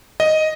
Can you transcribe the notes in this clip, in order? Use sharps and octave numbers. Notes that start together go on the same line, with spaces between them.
D#5